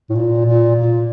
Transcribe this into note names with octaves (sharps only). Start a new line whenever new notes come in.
A2
A#2
A#2
A#2